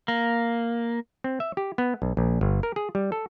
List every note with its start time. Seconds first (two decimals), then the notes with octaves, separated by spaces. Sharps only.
0.08 A#3
1.24 C4
1.40 E5
1.57 G4
1.78 B3
2.02 B1
2.17 A#1
2.41 G1
2.63 A#4
2.76 G#4
2.95 G3
3.12 A4